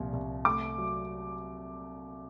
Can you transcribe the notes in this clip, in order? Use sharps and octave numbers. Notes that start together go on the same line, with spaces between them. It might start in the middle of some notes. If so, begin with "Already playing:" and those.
Already playing: C2 A#2 F3
C2
A3 D6
F#3